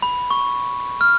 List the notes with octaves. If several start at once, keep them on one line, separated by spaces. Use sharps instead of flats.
B5
C#6
F6